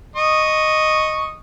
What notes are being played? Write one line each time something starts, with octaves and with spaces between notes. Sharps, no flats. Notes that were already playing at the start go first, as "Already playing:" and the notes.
D#5 C#6 D#6